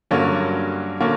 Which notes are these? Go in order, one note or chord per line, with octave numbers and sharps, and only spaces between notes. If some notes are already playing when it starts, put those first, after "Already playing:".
G2 D3 F#3 A#3 C#4
D3 F#3 A#3 C#4